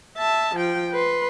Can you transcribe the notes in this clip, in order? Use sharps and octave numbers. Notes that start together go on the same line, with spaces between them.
E5 A5
F3 G5
B4 C6